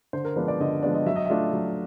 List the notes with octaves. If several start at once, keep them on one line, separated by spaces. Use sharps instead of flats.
D3 C5
A#4
F3 G#3 B3 D4 B4
D5
D3 D#5
F3 G#3 B3 D4 D5
D#5
F#3 E5
D#5
A3 D4 F4 E5
F#3